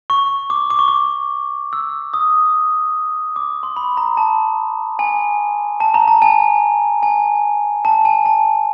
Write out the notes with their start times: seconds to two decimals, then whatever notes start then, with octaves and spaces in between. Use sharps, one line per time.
0.10 C#6
0.50 D6
0.70 D6
0.79 C#6
0.88 D6
1.73 E6
2.14 D#6
3.36 D6
3.63 C6
3.76 B5
3.97 A#5
4.17 A5
4.99 G#5
5.80 A5
5.94 A#5
6.08 A5
6.22 G#5
7.03 G#5
7.85 A5
8.05 G#5
8.25 A5